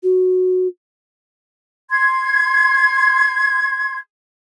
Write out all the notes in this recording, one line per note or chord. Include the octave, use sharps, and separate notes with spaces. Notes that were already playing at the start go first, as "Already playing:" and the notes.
F#4
C6 G#6